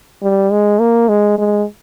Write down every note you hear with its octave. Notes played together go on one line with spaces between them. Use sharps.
G3
G#3
A#3
G#3
G#3